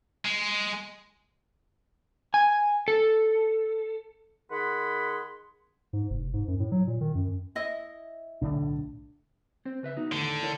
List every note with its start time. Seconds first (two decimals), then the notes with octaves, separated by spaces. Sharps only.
0.25 G#3
2.34 G#5
2.88 A4
4.51 D#3 G#4 F#5 B5 C6
5.93 G#2
6.10 F1
6.34 G#2
6.48 F#2
6.60 A2
6.72 F#3
6.87 A#2
7.01 D#3
7.15 F#2
7.55 E4 D#5 E5
8.41 B1 A2 D3 D4
9.65 C4 C5
9.83 C#3 B4 E5
9.97 B3 D#4 F#4
10.11 E2 A2 D3 D#3
10.43 E4 A#4 C#5